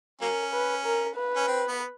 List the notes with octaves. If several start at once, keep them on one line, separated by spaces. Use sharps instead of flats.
F#3 A#3 C#4 A#4
B4
A#4
B4
C#4
C4
B3